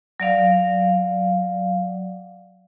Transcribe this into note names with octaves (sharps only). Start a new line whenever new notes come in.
F#3 D5 F5